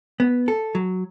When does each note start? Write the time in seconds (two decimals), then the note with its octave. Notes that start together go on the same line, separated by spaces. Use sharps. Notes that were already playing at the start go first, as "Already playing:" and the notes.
0.20 B3
0.48 A4
0.75 F#3